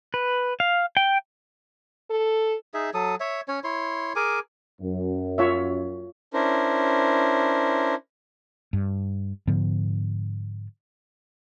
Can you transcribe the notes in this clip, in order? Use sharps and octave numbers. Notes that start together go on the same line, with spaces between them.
B4
F5
G5
A4
D#4 G#4 E5
F#3 A4 D#6
C#5 E5
C#4 C#5
E4 C#5 C6
G#4 A#4 G#5 D6
F#2
F4 C#5 E5
C#4 D4 E4 A#4 C5
G2
G#2 D3 F3 B3